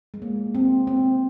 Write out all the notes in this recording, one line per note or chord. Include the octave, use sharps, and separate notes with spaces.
G#3
A#3
C4
C4